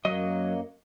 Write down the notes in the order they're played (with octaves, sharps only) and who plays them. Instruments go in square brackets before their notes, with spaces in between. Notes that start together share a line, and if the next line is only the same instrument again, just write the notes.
[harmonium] F#2 A#3 [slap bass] F#3 [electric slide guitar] C#5 D#5